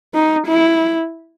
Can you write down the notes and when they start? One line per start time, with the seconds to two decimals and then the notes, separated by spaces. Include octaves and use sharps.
0.14 D#4
0.47 E4